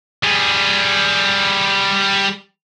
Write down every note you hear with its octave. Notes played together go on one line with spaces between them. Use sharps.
G3 G#4